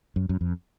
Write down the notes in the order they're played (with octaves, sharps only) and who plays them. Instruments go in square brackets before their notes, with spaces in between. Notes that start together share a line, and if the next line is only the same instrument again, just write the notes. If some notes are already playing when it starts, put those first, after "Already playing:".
[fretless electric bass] F#2
F#2
F2